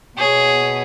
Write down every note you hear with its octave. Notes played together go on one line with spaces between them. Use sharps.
B2 B3 G#4 C#5